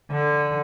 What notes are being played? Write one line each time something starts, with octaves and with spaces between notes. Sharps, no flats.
D3